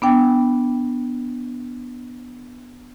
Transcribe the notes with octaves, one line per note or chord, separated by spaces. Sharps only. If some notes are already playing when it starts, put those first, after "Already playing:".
B3 D4 G5